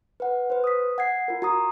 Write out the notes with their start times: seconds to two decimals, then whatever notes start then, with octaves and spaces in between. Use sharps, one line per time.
0.20 B4 F#5
0.50 B4 C5
0.64 D#6 B6
0.98 F#5 G#6 C7
1.28 F4 A#4
1.42 F#4 A#5 D#6